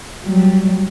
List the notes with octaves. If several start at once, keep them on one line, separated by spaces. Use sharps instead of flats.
F#3 G3